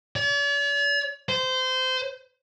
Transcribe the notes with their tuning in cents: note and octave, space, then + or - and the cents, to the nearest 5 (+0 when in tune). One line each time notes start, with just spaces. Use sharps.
D5 -45
C5 -20